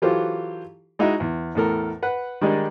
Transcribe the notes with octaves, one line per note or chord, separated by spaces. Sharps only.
E3 F#3 F4 G4 A4 C5
G#3 D#4 E4 F#4 E5
E2
E2 A2 A4 A#4
B4 F#5
D#3 G3 G#3 D4 D#4